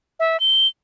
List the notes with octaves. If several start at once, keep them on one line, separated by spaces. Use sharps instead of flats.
E5
G7